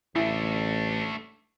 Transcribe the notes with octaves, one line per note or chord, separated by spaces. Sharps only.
A1 A3 D4 E4